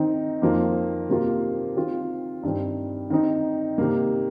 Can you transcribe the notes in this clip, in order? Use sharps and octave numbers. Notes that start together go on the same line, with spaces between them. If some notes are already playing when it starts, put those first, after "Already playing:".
Already playing: D#3 C4 D#4
F2 D#3 A#3 F4
C3 D#3 A#3 F4
D#3 C4 F4
G2 D#3 C4
D#3 C4 D#4
C3 D#3 A#3